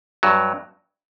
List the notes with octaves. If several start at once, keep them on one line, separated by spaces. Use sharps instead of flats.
G2 F#3